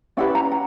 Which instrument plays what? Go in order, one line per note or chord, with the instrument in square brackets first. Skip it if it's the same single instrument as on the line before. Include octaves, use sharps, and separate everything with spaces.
[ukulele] C#4 E4 G4 B4 D5 F#5
F#5 A#5
F#5